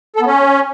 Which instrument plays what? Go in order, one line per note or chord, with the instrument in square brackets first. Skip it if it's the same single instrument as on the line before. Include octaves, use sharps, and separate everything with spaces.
[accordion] A4
B3
C#4